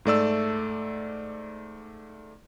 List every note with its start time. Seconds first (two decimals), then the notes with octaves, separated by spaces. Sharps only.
0.05 G#2 A3 D5 E6